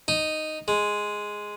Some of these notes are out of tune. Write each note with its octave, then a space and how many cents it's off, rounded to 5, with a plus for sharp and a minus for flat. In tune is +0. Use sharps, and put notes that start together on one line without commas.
D#4 -5
G#3 +0